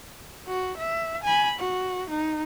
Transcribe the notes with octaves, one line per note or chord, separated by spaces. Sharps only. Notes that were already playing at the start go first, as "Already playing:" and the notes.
F#4
E5
G#5 B5
F#4
D#4